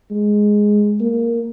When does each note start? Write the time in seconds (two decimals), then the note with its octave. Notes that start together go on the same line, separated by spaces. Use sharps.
0.10 G#3
1.00 A#3